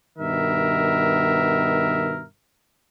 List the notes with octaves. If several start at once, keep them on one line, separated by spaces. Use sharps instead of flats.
G2 B2 D#3 B3 A#4 E5